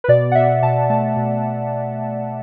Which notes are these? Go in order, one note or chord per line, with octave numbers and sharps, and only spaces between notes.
B4
B2 D5
F#5
B2 E5
B2 A5
A3 A5
B2